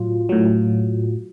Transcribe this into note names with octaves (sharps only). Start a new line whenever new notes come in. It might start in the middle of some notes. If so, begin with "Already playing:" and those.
Already playing: A2 F#3 F4
A2 F#3